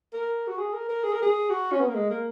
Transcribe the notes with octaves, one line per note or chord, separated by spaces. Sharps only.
A#4
F#4
G#4
A#4
A#4
G#4
A#4
G#4
F#4
C#4
B3
A#3
G#3
A#3